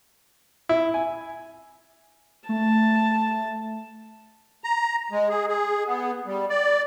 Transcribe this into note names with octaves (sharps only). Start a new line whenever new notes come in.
E4
G#5
A3 A5
A#5
G#3
G#4
G#4
B3
G3
D5